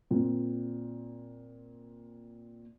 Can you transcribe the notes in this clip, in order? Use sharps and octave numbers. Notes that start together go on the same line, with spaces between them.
A#2 C4